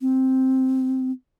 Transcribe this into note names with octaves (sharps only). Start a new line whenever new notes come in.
C4